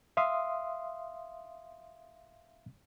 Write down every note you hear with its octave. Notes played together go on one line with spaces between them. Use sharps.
E5 F5 C6 D#6